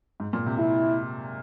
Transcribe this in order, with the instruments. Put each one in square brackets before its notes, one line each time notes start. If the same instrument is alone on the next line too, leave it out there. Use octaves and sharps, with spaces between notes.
[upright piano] G#2
A#2
C3
[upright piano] C3 [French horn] E4